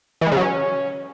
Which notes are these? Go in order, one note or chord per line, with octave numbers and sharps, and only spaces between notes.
E3
G#3
C#3
F#3
C#4